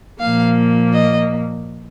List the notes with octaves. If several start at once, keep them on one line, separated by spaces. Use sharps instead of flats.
A#2 F3 A#3 F5
D#5